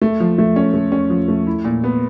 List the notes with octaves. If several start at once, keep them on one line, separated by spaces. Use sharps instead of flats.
A3
F3
A3
C#4
A3
C#4
F3
A3
E4
A#2
B3